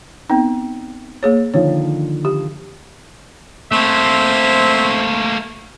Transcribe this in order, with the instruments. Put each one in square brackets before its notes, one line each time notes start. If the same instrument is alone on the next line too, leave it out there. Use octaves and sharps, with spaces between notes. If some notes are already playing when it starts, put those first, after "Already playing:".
[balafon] B3 C4 D#4
A#3 G#4 C#5
[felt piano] D3 D#3 F3 [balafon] C#5
[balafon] G4
[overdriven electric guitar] A3 A#3 [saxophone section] C4 C5 E5